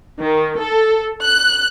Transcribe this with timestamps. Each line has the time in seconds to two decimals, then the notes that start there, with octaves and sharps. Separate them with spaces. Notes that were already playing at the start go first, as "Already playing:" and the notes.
0.21 D#3
0.60 A4
1.23 F#6